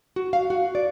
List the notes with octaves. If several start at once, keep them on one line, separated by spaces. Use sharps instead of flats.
F#4
F5
F#4
D5